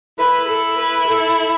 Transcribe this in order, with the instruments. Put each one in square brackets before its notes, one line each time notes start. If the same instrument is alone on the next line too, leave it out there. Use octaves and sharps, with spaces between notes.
[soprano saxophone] E4 [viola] B4
[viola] A4
B4
A4